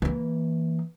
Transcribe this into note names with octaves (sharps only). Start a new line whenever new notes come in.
E3 A#3